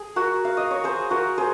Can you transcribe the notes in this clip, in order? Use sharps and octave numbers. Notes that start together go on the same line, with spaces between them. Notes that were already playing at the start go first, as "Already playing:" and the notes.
Already playing: G#4
F#4 A#4
F5
D#5
C#5
G#4 C5
F#4 A#4
G#4 C5